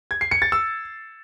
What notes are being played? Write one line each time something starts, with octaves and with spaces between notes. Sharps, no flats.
G#6
C7
C#7
A6
E6